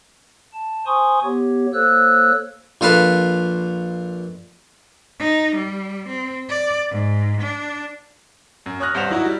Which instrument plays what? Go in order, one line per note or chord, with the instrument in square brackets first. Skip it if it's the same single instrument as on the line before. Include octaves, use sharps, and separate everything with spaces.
[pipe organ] A5
C5 G#5 C6 C#6 D#6
B3 G4 C#5
A#3 A4 C5 C#5 E6 F#6
[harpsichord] A#1 F4 A4 B4 F5
[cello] D#4
G3
C4
D5
G#2
D4
[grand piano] F#2
C#5 D#6 F6 F#6 A#6
D#1 G2 C5 F#5 E7 F7
F#3 D#4 E4 F#4
G3